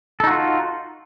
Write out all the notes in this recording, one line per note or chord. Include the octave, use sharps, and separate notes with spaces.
D#4 F4 F#4 A4